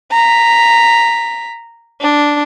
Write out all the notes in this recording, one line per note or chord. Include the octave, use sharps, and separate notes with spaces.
A#5 B6
D4